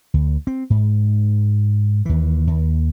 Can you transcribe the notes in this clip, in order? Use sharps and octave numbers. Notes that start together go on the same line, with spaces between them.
D2
C4
G#2
D#2 E3
D#2